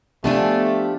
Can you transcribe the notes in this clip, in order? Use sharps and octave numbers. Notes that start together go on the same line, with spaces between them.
F3 A3 B3 D4 G4 G#5